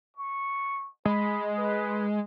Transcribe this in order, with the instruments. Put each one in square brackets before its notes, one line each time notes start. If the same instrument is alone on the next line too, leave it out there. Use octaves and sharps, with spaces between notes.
[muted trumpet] C#6
[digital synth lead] G#3 [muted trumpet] B5
[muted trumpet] B4